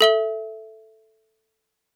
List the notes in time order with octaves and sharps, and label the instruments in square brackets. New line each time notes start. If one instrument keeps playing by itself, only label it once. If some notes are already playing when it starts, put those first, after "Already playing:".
[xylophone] A4 E5 G7